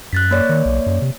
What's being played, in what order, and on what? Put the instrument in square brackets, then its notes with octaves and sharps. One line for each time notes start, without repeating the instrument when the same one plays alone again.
[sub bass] F#2 [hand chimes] F#6 A6 B6
[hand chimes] A#3 C#5 D5
[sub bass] D#3
B1
F#2
C3